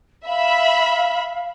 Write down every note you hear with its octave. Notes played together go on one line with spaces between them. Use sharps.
E5 F5 B5